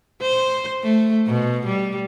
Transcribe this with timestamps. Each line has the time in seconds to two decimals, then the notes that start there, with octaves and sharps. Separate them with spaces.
0.21 C5
0.83 A3
1.27 B2
1.66 G3